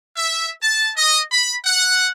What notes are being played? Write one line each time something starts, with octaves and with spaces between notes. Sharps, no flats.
E5
A5
D#5
B5
F#5